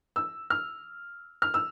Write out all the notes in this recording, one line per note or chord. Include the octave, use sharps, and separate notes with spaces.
E6
F6
F6
E6